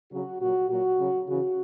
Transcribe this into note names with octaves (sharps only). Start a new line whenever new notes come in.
C#3 F#3 F#4
A#2 F#3 F#4
A#2 F#3 F#4
C#3 F#3
C#3 E3 F#4